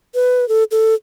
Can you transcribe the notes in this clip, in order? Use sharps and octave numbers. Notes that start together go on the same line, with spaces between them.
B4
A4
A4